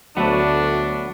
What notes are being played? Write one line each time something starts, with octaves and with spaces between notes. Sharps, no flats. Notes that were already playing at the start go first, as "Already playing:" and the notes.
D2 F#3 A3 B3 D4